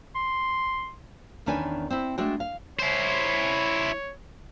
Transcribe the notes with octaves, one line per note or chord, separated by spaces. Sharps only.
C6
E2 D#3 C#4 D4 B4 G#5
C4 E4
G#3 A3 D4 F#4 G5
F5
E4 C5 C#5